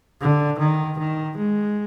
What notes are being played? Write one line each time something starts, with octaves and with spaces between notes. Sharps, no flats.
D3
D#3
D#3
G#3